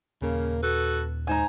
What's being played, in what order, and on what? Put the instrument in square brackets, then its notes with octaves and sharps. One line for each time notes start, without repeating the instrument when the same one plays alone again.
[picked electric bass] D#1 [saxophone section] C#3 A#3
[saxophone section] F#4 A4 B4
[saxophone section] G#2 D#4 C5 [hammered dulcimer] G#5 A#5